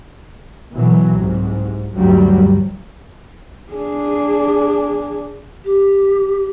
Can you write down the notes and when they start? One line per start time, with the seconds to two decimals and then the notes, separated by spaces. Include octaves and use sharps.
0.73 B2 E3 F#3
1.14 C2 G#2
1.95 D2 G2 F#3 G3
3.72 D4 G#4
5.65 G4